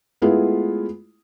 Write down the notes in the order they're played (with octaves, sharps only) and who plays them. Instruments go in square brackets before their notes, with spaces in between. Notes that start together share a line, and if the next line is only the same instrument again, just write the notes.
[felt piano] G#3 A3 B3 E4 F4 G#4